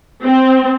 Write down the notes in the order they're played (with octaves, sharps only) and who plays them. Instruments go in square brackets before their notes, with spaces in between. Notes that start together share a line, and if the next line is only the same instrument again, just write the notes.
[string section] C4